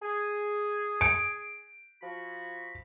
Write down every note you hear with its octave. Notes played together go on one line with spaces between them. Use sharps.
G#4
D7
F3 F#4 B5